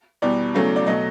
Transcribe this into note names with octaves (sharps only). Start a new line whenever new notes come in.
E2 B2 G3 D5
E2 C#3 F#3 A3
D5
B2 F#3 A3 D#5